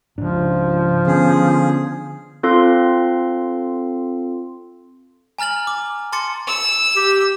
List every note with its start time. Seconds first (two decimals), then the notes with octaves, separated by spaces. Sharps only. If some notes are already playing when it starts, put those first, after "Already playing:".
0.18 G#2 C#3 F3 D4
1.07 D3 B3 C#4 D4 G#4
2.43 C4 F4 A4 C6
5.39 G#5 A#5 F6 A6 F#7
5.67 D6
6.12 A5 C6 D6 A6 C#7
6.47 E6
6.96 G4